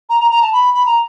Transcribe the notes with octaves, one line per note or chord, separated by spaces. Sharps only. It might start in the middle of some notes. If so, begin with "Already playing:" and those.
A#5
A#5
A#5
A5
B5
B5
A#5